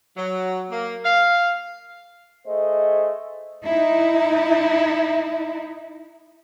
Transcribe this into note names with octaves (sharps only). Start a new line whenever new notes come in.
F#3
A#3
F5
A3 G#4 C5 D#5
D#4 E4 E5